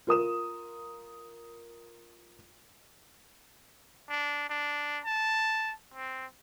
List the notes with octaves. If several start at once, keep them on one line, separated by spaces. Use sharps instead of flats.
F4 A#4 D#6 E7
D4
D4
A5
C4